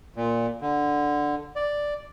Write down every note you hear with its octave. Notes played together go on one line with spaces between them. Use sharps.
A#2
D3
D5